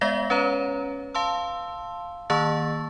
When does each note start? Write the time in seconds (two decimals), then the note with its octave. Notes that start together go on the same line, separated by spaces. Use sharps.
0.01 G#3 B3 D5 E5 F5 A#6
0.30 C#4 B4 C#5 A#5
1.15 F5 A5 C6 E6
2.30 D#3 A#3 A5 C#6 E6 A6